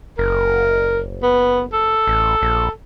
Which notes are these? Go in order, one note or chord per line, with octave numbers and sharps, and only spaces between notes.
F#1 A#4
B3
A4
A1
A#1